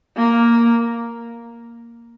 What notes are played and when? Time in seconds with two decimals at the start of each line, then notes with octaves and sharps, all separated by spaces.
0.17 A#3